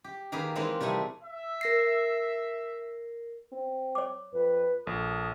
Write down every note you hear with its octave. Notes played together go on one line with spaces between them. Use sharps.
G4
D#3 A#3 G4 G#4 B4
E3 G#3 A#3 C4 D#4
C3 G3 A3 G#5
E5
A#4 A#6 C7
C4
C#5 D6
F2 B4
A#1 A4 D#6